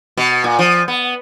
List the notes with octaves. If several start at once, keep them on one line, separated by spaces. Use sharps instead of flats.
B2
A#2
F3
B3